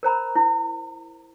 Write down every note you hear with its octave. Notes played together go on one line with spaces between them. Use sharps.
A#4 C5 A#5 B5
E4